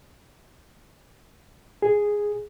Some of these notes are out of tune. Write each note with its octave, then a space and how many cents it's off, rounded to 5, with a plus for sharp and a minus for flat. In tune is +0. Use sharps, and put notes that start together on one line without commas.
G#4 -5